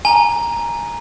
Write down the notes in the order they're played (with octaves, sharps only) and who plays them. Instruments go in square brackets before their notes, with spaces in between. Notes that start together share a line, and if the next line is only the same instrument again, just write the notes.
[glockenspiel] G#5 A#5